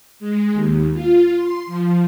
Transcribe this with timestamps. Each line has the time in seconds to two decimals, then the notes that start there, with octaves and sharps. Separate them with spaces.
0.20 G#3
0.54 D#2
0.93 F4
1.35 C6
1.66 F3